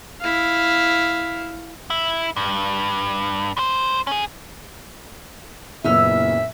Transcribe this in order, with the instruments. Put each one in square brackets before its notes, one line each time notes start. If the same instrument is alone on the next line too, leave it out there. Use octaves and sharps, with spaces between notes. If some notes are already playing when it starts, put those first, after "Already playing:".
[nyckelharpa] E4 F5
[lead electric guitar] E4
G2
G2 C5
C#4 G#4
[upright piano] F#1 A#2 B3 [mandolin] C#4 E6 F6 [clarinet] E5